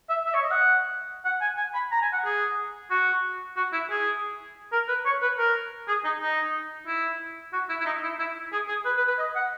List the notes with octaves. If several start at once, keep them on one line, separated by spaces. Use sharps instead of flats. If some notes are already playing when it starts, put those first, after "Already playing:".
E5
E5
C#5
D#5
F#5
F#5
G#5
G#5
B5
A#5
G#5
F#5
G#4
F#4
F#4
E4
G#4
A#4
B4
C#5
B4
A#4
G#4
D#4
D#4
E4
F#4
E4
E4
D#4
E4
E4
G#4
G#4
B4
B4
B4
D#5
F#5